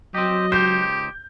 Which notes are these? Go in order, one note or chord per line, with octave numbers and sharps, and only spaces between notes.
F#3 C4 G4 D#5
C#2 D#4 G4 C5 G6